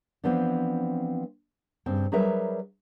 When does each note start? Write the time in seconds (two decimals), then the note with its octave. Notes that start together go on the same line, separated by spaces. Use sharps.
0.24 E3 F3 B3 C4 D4
1.86 G2 C#3 C4 G5
2.12 F#3 G3 G#4 A#4 B4 E5